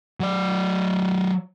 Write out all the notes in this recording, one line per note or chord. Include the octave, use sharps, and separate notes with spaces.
F#3 D5